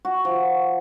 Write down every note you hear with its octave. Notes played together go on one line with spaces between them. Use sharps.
F#4
F3